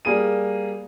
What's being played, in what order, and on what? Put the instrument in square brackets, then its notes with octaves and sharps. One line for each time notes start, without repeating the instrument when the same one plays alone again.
[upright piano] G3 A#3 G#4 D#7